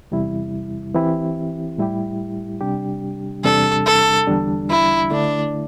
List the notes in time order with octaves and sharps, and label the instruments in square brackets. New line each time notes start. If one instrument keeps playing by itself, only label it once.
[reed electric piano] E2 C3 G3 E4
E3 C4 E4 G4
A2 G3 E4 G4
C3 G3 D4 G4
[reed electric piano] E2 C3 G3 D4 [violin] A4
[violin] A4
[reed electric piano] E2 D3 G3 D4
[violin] E4
[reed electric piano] D3 A3 E4 [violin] D4